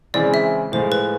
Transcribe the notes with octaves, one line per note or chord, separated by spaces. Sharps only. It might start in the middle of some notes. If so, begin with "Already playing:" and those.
C#3 E3 G#3 C4 E4 D5
E5
A2 F3 G#3 C5
B4